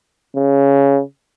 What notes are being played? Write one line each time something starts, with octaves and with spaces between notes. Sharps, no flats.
C#3